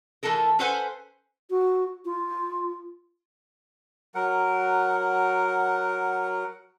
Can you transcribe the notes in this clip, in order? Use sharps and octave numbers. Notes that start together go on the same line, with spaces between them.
E3 A3 F4 A4 A#4
C#4 A4 B4 C5 F#5 G#5
F#4
F4
F#3 A#4 F#5